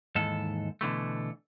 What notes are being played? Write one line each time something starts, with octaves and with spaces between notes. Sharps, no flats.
D#2 G#2 E3 A4
B2 D3 E3 A3